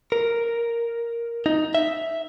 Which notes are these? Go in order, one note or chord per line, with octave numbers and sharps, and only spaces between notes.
A#4
D#4
E5